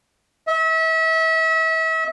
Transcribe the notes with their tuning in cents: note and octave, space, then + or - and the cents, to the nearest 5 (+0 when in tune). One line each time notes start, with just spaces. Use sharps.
E5 -35